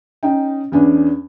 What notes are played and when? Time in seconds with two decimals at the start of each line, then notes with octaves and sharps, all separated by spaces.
0.23 C#4 D#4 G5
0.72 E2 B3 C#4 D4 G#5